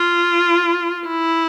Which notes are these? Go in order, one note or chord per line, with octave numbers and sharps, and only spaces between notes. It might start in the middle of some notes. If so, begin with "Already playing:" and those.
Already playing: F4
E4